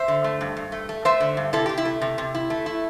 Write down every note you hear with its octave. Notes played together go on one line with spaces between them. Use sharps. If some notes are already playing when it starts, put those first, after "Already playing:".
Already playing: C5 E5
D3
A3
G2
G2
A3
A3
A3 C5 E5
D3
G2
C3 E4 A4
C3 G4
E4
A3
C3
C3
E4
A3
E4